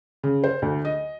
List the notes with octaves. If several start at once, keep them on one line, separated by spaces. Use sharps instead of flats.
C#3
C5
D2
D#5